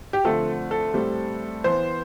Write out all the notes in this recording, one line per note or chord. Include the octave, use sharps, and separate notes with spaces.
G4
D3 F3 A3 C4 A4
A4
A2 G3 C4
E3 B3 C5